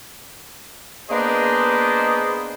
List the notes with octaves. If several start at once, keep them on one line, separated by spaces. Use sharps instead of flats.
A#3 B3 D4 G#4 C5 D#5